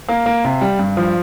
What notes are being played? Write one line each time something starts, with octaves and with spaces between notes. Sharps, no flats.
A#3 F5
A#3
C3
G3
G2
F3